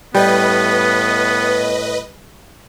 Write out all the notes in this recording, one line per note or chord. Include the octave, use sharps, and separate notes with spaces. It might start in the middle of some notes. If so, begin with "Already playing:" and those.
A2 G3 B3 B4 D#5